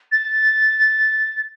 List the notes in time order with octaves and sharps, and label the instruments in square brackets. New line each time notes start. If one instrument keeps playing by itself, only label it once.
[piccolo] A6